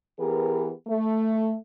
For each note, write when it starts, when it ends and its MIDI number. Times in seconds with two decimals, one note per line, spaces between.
0.19 0.72 52
0.19 0.72 59
0.19 0.72 67
0.19 0.72 68
0.19 0.72 70
0.87 1.56 57